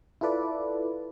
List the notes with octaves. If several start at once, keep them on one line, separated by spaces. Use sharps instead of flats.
E4 F4 A4 B4 D5